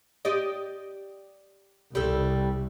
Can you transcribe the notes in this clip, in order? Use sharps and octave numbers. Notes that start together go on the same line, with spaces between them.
G4 D5 D#5
C2 G3 A4